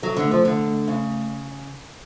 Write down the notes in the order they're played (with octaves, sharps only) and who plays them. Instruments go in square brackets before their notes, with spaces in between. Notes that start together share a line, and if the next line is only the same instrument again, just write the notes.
[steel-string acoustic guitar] F#3 [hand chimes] A4
[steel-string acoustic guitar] D3
[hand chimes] A3
[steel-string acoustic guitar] F3
[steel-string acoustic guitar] D3 [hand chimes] A4
[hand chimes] A3
[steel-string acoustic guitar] C#3 [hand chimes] A3